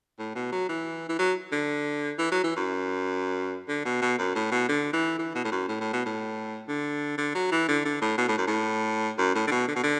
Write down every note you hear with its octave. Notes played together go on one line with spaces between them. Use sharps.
A2
B2
F#3
E3
E3
F#3
D3
E3
F#3
E3
F#2
D3
B2
B2
F#2
A2
B2
D3
E3
E3
B2
A2
F#2
A2
A2
B2
A2
D3
D3
F#3
E3
D3
D3
A2
B2
A2
F#2
A2
F#2
A2
D3
B2
D3
B2
D3